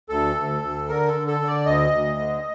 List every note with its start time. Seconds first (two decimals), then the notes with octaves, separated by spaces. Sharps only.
0.09 D2 A4
0.36 D2
0.62 D2
0.89 D3 A#4
1.07 A4
1.14 D3
1.27 A4
1.40 D3
1.47 D5
1.66 D2 D#5
1.92 D2
2.19 D3